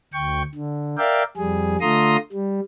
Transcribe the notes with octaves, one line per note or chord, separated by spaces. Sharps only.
D2 G5 C#6
D3
A#4 D5 E5 F5 G5
F2 G3 G#4
D3 A3 F4 A#5 C6 D#6
G3